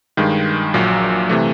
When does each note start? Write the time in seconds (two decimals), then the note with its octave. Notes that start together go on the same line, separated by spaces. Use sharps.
0.17 G2 D#3 G#3
0.74 A#1 A#2 F#3
1.29 C3 E3 A3